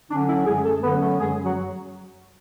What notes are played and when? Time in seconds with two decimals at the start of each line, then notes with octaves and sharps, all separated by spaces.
0.10 D3 F#3 C#4 D4
0.28 E4
0.46 F#2 G#3 G#4
0.65 A3 A4
0.83 D3 F#3 B3 C#4 B4
1.01 A3 A4
1.20 F#2 G#3 G#4
1.44 F#3 F#4